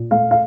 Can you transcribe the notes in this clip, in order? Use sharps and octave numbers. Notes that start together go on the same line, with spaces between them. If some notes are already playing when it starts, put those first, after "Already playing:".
Already playing: A#2
A3 F5
F5